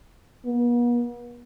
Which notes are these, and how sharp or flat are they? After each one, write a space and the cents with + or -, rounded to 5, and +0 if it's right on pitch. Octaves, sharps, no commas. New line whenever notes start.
B3 -45